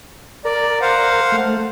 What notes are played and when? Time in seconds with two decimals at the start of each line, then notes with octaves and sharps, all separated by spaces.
0.45 A#4 D5
0.82 C5 F5 F#5
1.32 A3